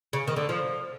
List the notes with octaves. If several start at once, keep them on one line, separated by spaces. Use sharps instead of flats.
C#3
D#3
D3
F3